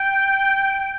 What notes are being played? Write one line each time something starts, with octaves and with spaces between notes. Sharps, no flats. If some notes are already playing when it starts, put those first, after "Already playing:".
Already playing: G5